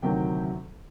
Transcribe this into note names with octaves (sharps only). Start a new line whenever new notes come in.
D2 C3 D#3 F#3 G4 G5